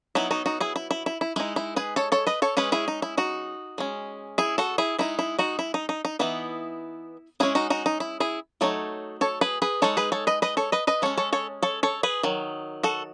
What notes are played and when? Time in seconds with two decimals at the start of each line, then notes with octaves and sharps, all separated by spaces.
0.15 F#3 B3 D#4 E4
0.31 D#4 F#4
0.46 D#4 F#4
0.60 E4 G#4
0.76 E4
0.91 E4
1.06 E4
1.21 E4
1.36 G#3 D#4 E4
1.56 E4
1.76 G#4 B4
1.96 A4 C#5
2.12 A4 C#5
2.27 B4 D#5
2.42 A4 C#5
2.57 G#3 C#4 G#4 B4
2.72 E4 G#4
2.88 D#4
3.02 E4
3.17 D#4 F#4
3.78 G#3 C#4
4.38 E4 G#4
4.58 F#4 A4
4.78 E4 G#4
4.99 G#3 D#4 E4
5.19 E4
5.39 D#4 F#4
5.59 E4
5.74 D#4
5.89 D#4
6.05 D#4
6.19 E3 B3 D#4 E4
7.40 G#3 C#4 E4 G#4
7.55 D#4 F#4
7.70 D#4 F#4
7.86 D#4
8.00 E4
8.20 E4 G#4
8.61 F#3 A3 D#4 A4 C#5
9.21 A4 C#5
9.41 G#4 B4
9.62 G#4 B4
9.82 G#3 D#4 A4 C#5
9.97 G#4 B4
10.12 A4 C#5
10.27 B4 D#5
10.42 B4 D#5
10.57 A4 C#5
10.72 B4 D#5
10.87 B4 D#5
11.02 G#3 C#4 A4 C#5
11.17 A4 C#5
11.33 A4 C#5
11.63 A4 C#5
11.83 A4 C#5
12.03 G#4 B4
12.23 D#3 F#3
12.83 F#4 A4